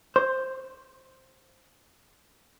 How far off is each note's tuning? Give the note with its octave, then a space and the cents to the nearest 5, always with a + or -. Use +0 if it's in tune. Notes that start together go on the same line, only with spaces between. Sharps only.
C5 +5